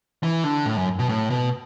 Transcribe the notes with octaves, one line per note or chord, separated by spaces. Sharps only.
E3
D3
A2
F#2
B2
A2
B2